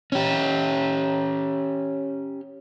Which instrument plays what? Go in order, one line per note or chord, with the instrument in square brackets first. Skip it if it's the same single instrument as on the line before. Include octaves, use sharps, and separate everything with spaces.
[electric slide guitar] C#4 G4